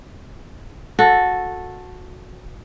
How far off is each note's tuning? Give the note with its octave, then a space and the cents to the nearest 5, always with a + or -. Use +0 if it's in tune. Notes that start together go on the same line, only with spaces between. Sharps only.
F#4 -15 A4 +0